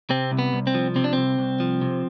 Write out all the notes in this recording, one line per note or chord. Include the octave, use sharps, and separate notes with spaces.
C3 C4
C2
B3
C2
C4
F3
C3 C4
D4
C2 C4
C2
F3
C3